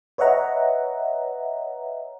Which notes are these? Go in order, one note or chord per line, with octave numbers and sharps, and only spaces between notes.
B4 C#5 D#5 E5 F#5 A#5